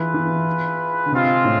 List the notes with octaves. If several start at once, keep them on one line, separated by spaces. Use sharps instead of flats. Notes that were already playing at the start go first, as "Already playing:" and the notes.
Already playing: E3 F4 G#4 B4 E5
E3
D3
C3 G#3 C4 F4
A2